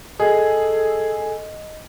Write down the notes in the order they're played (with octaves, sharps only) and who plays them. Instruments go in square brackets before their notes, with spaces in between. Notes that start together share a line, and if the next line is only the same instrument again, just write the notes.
[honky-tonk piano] G#4 [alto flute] A4 [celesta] D#5